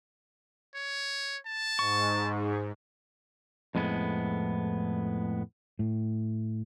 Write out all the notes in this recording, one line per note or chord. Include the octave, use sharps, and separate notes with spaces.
C#5
A5
G#2 C#6
F2 A2 G#3 B3
A2